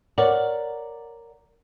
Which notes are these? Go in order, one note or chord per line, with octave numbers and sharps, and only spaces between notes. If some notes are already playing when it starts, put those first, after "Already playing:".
A#4 C#5 D5 F#5